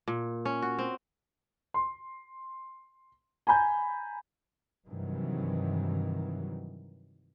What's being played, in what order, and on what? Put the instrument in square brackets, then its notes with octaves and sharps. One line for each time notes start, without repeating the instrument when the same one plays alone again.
[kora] A#2
C#4
F#4
C4
[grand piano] C6
G#5 A#5 B5 G6
[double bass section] G2 C3 D#3 E3 F#3